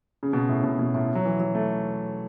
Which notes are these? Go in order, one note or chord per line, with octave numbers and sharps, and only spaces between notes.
C#3
B2
A2
B2
B2
A2
F#3
E3
F#3
A3